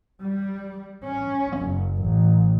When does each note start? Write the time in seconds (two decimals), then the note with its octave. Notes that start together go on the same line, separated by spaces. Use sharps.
0.21 G3
1.04 C#4
1.59 F#1
2.03 A1